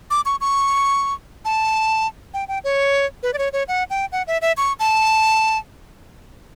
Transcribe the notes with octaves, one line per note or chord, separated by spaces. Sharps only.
D6
C#6
C#6
A5
G5
G5
C#5
B4
D5
C#5
C#5
F#5
G5
F#5
E5
E5
C#6
A5